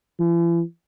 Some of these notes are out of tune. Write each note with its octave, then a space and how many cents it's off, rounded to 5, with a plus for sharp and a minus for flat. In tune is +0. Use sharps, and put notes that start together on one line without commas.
E3 +45